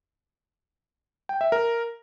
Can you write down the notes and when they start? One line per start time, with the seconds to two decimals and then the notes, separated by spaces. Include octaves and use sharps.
1.29 G5
1.41 E5
1.52 A#4